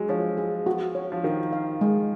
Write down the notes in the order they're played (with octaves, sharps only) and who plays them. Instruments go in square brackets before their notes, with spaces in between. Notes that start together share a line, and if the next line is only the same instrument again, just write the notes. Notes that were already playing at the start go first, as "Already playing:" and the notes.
Already playing: [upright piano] F#3 G#3
[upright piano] F3 [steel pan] C#5
[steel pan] G#4
F#4
C#5
[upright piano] F3
[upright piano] D#3 [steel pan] F#4
[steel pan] F5
G#3